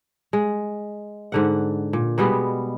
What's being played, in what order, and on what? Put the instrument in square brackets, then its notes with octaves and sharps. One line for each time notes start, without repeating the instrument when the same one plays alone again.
[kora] G#3
G#2 D3 F#5
A#2
B2 G3 G#3 B3